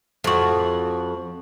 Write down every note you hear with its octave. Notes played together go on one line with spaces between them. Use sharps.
F2 F#4